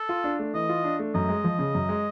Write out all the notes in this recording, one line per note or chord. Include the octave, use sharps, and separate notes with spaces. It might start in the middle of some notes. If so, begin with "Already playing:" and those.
Already playing: A4
F4
D4
A3
E3 D#5
F4
D4
A3
F#2 D#5
G#3
F3
C#3
F#2
G#3